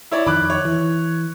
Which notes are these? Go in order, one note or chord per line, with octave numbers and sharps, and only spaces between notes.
E4 C#5 D5
F2 D#3 B5 D6 F#6
C#5
E3